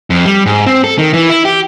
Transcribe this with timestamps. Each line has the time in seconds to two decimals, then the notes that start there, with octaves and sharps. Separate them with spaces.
0.10 F2
0.25 G3
0.46 G#2
0.66 C4
0.84 A4
0.99 D#3
1.14 E3
1.30 E4
1.45 G4